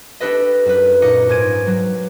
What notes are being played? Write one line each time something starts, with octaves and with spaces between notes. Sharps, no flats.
D4 G4 A4 B4 D#5
F#2 B4
A#2 D#4 D#5 D6 C#7
G#2 C#4 G#6 D7 D#7
F#3